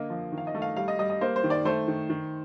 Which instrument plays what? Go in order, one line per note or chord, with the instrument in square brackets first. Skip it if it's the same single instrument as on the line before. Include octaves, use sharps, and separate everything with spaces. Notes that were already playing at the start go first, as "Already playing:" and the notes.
Already playing: [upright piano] D3 A#3 D#5
F3
D#3
F5
D#5
A3
F5
G3 F5
D#5
G3 D#5
D#5
A#3 C5
C5
D#3
D5
A3 C5
D#3
D#3